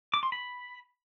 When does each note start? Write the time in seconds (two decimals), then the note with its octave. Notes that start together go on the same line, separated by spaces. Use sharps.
0.14 D6
0.23 C6
0.32 B5